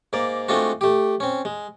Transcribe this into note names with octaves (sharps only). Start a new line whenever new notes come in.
G#2 A#3 D5
G#3 A3 C4 D4 F4 F#4
A3 G4
C4 C#4
G#3